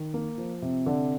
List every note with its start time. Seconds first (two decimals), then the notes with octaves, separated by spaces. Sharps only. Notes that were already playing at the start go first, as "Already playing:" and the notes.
Already playing: D#3
0.14 A#3
0.38 F3
0.62 C3
0.86 D3